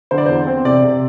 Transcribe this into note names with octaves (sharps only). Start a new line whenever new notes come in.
D3 C5
D5
E2 C5
C4
C3 D5
C3